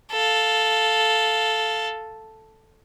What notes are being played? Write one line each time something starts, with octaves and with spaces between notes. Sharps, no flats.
A4 F5